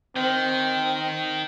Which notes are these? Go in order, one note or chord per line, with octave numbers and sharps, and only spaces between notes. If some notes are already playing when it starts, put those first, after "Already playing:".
D#3 C4